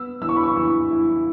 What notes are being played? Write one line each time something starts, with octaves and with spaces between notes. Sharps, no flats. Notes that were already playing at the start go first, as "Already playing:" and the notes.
Already playing: B3 E6
E3 E6
C#6
B5
C#6
E3
E4